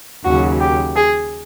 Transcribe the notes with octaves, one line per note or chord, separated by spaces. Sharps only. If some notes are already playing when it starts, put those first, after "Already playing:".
D#2 C#3 F#3 F#4
G4
G#4